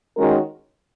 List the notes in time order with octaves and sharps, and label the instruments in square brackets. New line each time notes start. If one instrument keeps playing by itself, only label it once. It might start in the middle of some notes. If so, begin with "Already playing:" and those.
[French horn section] D#3 G#3 C#4 F#4 A#4